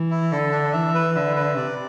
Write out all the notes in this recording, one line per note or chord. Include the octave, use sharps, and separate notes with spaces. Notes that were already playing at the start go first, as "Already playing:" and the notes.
Already playing: E3
E4
D3 A4
D4
E3 E5
B4
D3 E5
B4
C3 D5